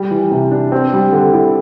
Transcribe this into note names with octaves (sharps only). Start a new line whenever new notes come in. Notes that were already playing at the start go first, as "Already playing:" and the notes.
Already playing: G3
E3
C3
D4
C4
G3
D3
E4